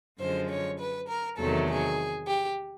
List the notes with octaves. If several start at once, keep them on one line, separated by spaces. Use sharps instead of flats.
F#2 D3 F3 G#3 C5
C#5
B4
A#4
E2 C3 D#3 F#3 A3 A4
G#4
G4